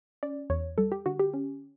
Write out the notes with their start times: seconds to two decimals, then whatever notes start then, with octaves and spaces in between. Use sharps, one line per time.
0.23 C#4 D5
0.50 E2 C#5
0.78 G3 A4
0.92 G4
1.06 D3 F#4
1.20 G4
1.34 C#4